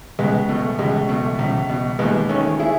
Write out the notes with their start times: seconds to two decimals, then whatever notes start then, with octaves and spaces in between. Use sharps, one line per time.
0.19 C#2 G#3 B3
0.49 B2 A3
0.79 C#2 G#3
1.09 B2 A3
1.39 C#2
1.69 B2
1.99 D#2 G#3 B3
2.29 D#3 A3 C#4
2.59 E4 G#4